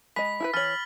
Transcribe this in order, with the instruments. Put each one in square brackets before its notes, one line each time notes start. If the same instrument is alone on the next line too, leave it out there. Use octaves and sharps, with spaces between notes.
[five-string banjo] G#3 D#5 [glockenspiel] B5 [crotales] B6
[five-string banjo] E4 A4 B4
[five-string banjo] E3 C#5 [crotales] F6 F#7 [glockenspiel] A6